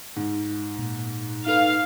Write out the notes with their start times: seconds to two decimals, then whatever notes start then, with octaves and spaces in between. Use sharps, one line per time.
0.16 G#2
0.79 A#2
1.47 D#4 A4 B4 F5